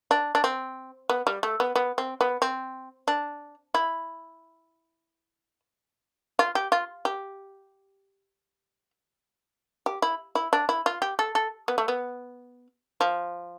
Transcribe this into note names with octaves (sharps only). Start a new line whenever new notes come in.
D4
D4
C4
B3
G3
A3
B3
B3
C4
B3
C4
D4
E4
F4
G4
F4
G4
G4
E4
E4
D4
E4
F4
G4
A4
A4
B3
A3
B3
F3